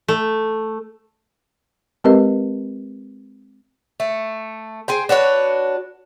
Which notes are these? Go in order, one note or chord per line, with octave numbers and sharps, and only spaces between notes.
A3
G#3 C4 G4 A#4 B4 D#5
A3
G#4 C5 G5
D4 F#4 B4 C#5